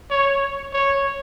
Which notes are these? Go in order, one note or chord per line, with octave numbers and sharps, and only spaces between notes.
C#5
C#5